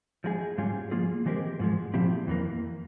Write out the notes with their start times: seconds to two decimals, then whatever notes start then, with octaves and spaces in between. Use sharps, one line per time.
0.24 F3 G#3 E4 G#4
0.58 G#2 G3 C#4 F4 G#4
0.91 F3 A#3 F4 G#4
1.26 E3 G#3 C4 G4 A#4
1.59 G#2 F3 G#3
1.94 A#2 F3 C4 E4 G4
2.27 F2 E3 A#3